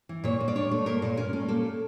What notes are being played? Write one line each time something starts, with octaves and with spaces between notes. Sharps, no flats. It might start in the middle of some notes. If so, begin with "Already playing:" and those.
E3
A#2 C#5
A#2
D5
D4 C#5
A3
A#2 A#4
A#2
C#4 A#4
A3
A#3 A4